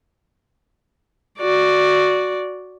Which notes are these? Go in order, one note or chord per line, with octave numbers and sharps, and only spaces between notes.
F#4 D5